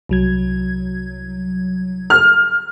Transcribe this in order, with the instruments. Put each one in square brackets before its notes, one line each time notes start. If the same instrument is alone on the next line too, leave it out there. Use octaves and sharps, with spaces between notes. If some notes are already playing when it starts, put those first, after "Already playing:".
[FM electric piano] C2 F#3 G#6
[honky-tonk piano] F6